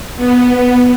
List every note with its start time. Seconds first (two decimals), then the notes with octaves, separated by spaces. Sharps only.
0.16 B3